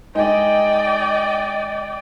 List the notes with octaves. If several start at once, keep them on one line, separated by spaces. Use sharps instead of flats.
G#3 D#4 D5 D#5 G5